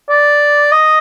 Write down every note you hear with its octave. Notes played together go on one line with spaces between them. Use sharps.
D5
D#5